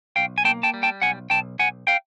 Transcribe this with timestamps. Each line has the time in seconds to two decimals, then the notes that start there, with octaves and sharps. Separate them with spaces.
0.16 B1 F5 G5
0.38 G#5
0.45 A#3 G5 A5
0.63 G5 A5
0.74 G3
0.83 G5 A5
1.02 B1 F#5 G#5
1.30 B1 G5 A5
1.59 B1 F#5 G#5
1.87 F5 G5